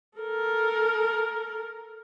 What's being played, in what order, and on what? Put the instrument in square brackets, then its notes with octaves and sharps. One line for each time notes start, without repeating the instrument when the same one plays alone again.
[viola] A4 A#4